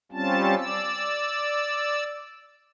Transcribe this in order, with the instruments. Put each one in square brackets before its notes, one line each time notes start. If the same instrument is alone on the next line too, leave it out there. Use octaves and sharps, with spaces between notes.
[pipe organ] G3 C4 C#4 F4 A5
D5 E6